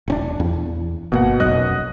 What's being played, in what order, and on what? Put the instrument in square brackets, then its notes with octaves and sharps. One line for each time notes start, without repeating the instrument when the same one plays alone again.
[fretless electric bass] D#1 C4 D4
E2
[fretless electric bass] G1 A#3 [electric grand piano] B2 F#5
[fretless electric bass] F1 B1 F#2 [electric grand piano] D#5 F#6